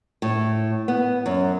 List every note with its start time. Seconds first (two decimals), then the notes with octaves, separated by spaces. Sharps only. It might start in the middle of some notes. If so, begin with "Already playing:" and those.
0.22 A2
0.88 B3
1.26 F#2